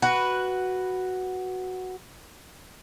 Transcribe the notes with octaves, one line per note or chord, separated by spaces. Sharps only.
F#4 B4